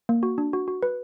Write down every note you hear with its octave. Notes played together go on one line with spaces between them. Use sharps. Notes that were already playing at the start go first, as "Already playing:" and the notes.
A#3
F#4
D4
F#4
F#4
B4